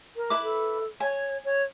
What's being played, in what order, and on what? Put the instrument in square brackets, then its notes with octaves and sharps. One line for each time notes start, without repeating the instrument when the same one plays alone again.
[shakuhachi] A#4
[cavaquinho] E4 B4 D6
[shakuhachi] A4
[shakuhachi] C#5 [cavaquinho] G#5
[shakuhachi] C#5